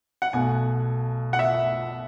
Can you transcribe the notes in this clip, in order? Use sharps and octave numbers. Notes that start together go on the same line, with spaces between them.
F#5
B1 B2 A3 G#5
F#5
E5